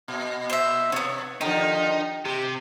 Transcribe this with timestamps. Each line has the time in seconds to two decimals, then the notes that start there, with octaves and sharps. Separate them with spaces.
0.08 A#2
0.50 C5 E5
0.92 B2 B3 C#5
1.41 D3 D#3 F3 D#4 G4
2.25 C3 G4